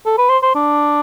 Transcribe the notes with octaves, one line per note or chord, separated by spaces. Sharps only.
A4
B4
C5
C5
D4